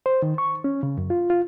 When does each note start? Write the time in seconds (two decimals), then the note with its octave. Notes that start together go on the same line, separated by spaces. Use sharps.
0.06 C5
0.22 D#3
0.38 C#6
0.64 C#4
0.83 C#3
0.98 F#2
1.10 F4
1.30 F4